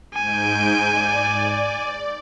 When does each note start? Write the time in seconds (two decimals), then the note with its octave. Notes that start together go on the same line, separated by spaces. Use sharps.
0.14 G#2 G#5 G6 D7
0.89 D5